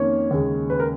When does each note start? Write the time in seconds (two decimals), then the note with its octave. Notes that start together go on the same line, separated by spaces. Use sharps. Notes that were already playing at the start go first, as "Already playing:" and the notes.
Already playing: F2 D#3 A#3 C#4 C#5
0.31 D#2 C#3 G#3
0.70 B4
0.80 A#4